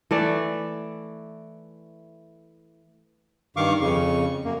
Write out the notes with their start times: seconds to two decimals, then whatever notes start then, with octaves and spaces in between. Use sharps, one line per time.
0.11 E3 A3 D5
3.57 G2 D#3 F5 C#6 D6
3.81 F2 C#3 C#6
4.45 F#2 A#3